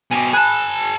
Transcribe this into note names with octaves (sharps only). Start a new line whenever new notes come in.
B2 G4 G#5
G#4 G#5 A5 B5 F#6